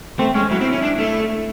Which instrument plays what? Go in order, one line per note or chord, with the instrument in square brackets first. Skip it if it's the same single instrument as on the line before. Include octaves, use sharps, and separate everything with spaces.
[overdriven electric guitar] A3 [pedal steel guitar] C4
[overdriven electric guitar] G#3 [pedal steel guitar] C#4
[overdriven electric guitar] F#3 [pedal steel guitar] E4
[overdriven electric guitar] C4
C#4
D4
A3